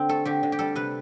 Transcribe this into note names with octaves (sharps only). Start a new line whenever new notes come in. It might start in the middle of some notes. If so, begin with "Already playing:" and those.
Already playing: D3 C4
A3 A4
D3 G4
D3
G4
G3 A4
C3 B4